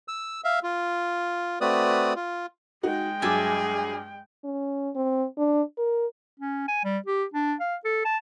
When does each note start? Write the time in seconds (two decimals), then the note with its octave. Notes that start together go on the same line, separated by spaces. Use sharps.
0.08 E6
0.44 E5 F5
0.63 F4
1.61 A3 C4 F#4 B4 D5 D#6
2.16 F4
2.83 G#3 D#4 F#4 G5
3.22 G2 F#3 G#4 E5 G#5 A5 D6
4.44 C#4
4.96 C4
5.38 D4
5.78 A#4
6.40 C#4
6.68 G#5
6.85 G3
7.06 G4
7.34 D4
7.60 F5
7.85 A4
8.05 A5